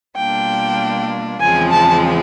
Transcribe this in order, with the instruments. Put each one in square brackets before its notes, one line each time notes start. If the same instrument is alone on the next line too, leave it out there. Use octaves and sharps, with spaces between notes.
[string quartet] B2 G3 A#3 D4 F4 [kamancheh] G5
[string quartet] E2 C#3 F3 G#3 C4 [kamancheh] G#5
[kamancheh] A5